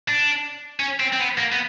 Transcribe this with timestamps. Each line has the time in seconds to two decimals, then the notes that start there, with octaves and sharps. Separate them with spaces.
0.08 D4
0.80 C#4
1.00 C4
1.13 C4
1.20 B3
1.39 A#3
1.52 B3